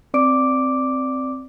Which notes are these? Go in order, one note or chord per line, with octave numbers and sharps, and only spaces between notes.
C4 D5 D6 D7